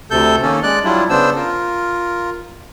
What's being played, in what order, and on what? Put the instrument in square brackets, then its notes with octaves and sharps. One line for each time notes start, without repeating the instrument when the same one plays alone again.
[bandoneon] D2 C3 A4 G6
D#3 A#3 C#4 A4
G#3 D5 F#6
F#3 G3 D4 E4 F4
C#3 B3 D4 C5 E6
F4 A#4